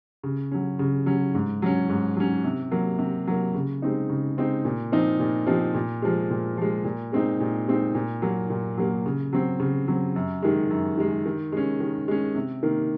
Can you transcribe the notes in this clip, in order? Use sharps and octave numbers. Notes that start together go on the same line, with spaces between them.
C#3
F#3 C#4
C#3
F#3 C#4
G#2
F#3 C#4
G#2
F#3 C#4
C3
F#3 A#3
C3
F#3 A#3
C#3
G#3 C4 D#4
C#3
G#3 C4 D#4
A#2
F3 C4 D#4
A#2
F3 C4 D#4
A#2
F3 G#3
A#2
F3 G#3
A#2
G#3 C4 D#4
A#2
G#3 C4 D#4
A#2
F#3 A#3
A#2
F#3 A#3
C#3
F#3 C4
C#3
F#3 C4
F#2
D#3 G#3
F#2
D#3 G#3
D#3
G#3 C#4
D#3
G#3 C#4
C3
D#3 A#3